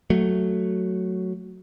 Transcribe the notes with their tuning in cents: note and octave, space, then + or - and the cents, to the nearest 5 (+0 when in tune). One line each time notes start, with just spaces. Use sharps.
F#3 +0 A3 +5